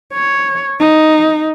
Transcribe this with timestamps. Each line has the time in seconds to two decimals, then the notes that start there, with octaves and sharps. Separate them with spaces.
0.13 C#5
0.79 D#4